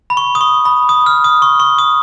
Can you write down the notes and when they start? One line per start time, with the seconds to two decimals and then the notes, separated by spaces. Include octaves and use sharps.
0.10 B5
0.17 C#6
0.35 D#6
0.41 C#6
0.65 B5
0.89 D#6
1.06 F6
1.24 D#6
1.42 C#6
1.60 C#6
1.79 D#6